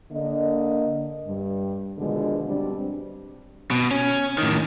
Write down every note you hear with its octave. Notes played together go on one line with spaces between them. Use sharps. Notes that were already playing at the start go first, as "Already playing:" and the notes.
D3 A#3 D#5
G2 G3
B2 D3 D#3 F3 G#3
B2 G3 C4 D4
B2
C#4
A2 D#3